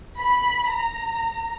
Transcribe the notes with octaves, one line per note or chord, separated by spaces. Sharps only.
B5
A#5